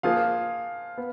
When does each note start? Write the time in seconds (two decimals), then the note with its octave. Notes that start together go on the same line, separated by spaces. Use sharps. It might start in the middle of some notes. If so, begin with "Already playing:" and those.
0.03 F3 A#3 F4 G#4 F5
0.97 B3